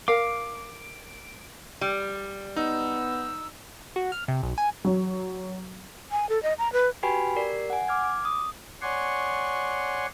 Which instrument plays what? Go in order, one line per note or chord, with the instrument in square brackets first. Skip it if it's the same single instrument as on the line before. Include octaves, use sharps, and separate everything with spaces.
[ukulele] A#4 F5 [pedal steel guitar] D6
[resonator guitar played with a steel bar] G3
[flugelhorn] B3 [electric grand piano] D#4 [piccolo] E6
[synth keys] F#4
F6
C3
B1
G#5
[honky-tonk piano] F#3
[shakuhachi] G#5
A4
D#5
A#5
B4
[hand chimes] F#4 G4 B4 G5 G#5 B5
G4 A#4 D5 C7
F#5 G#5
D6 F6 G#6
D6
D#6
[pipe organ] C#5 D5 F#5 G#5 C6 C#6